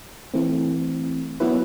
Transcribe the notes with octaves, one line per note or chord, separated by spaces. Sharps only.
E3 A3 C4
F#3 B3 E4 B4